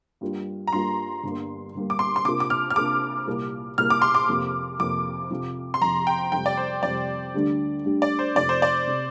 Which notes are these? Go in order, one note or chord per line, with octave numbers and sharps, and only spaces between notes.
G2 G3 A#3 F4
A#5
G2 G3 A#3 F4 C6
G1 G2 G3 A#3
G1 G2 G3 A#3
D6
C6
C6
C3 A#3 D4 F4 A#4 D6
D6
F6
F6
C3 A#3 D4 F4 A#4 D6
C2 A#2 A#3 G4 A#4
C2 A#2 A#3 G4 A#4 F6
D6
C6
D6
F2 C3 A#3 G4
F2 C3 A#3 G4 D6
F2 C3 F3
C6
F2 C3 F3 A#5
G5
F2 C3 G3 G5
D5
C5
F2 C3 G3 D5
D2 D3 G3 D4 G4
D2 D3 G3 D4 G4
D5
C5
F1 F2 C3 D5
C5
D5
C3